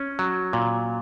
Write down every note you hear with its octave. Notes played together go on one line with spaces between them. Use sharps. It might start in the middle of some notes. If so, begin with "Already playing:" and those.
Already playing: C#4
F#3
A#2